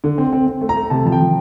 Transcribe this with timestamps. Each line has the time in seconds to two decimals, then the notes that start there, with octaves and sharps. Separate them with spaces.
0.04 D3
0.18 C4
0.33 C4
0.47 C4
0.61 A3
0.69 A#5
0.76 A3
0.90 C3 A5
1.05 F3 A5
1.12 G5
1.20 F3